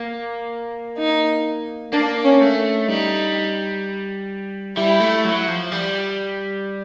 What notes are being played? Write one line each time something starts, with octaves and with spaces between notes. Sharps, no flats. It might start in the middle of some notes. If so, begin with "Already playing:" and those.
Already playing: A#3
D#4
A#3 D4
C#4
A3
G3 D#4
G3 E4
A3
F#3
F3
G3